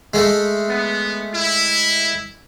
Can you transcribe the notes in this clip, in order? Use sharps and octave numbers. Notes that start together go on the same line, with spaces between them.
G#3 A3
B3
E4